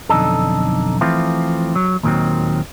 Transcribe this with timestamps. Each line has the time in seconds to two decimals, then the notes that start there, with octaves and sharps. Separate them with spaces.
0.09 B1 F2 D3 D#4 A4
1.01 E3 F3 A3 C4 F4
1.75 F#3
2.03 D#2 A#2 D#3 E3 F#3 C4